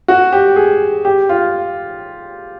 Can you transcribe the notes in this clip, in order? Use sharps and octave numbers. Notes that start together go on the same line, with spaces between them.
F#4
G4
G#4
G4
F4